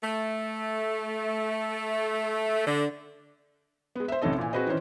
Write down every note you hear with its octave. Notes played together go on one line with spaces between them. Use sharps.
A3
D3
G#3 B3
C5 E5
A1 C3 C#4 D#4 A4 D#5
A#2 E3 G#5
C4 F#4 G#4 B4 C5 D#5
D#3 E3 C#4 C5 D#5